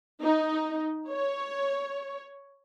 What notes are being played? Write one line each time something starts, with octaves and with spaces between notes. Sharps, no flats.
D#4
C#5